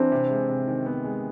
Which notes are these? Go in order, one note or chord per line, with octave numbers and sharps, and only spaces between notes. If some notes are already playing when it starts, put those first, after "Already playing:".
Already playing: E3 C4 D4
C3
G#3
C3
D#3
B3
G#3